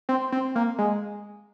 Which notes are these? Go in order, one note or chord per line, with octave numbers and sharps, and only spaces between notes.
C4
C4
A#3
G#3